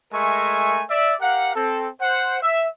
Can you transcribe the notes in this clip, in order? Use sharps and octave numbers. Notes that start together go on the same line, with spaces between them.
G#3 A3 A#4 E5 G#5 C#6
D5 E5
G4 A#4 F5 F#5
C4 A4
C5 F#5
E5